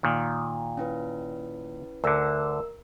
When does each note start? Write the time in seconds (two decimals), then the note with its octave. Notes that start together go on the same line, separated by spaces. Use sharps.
0.03 A#2 D#3
0.77 C#4 E4 B4
2.04 D2 D3 A#4 E6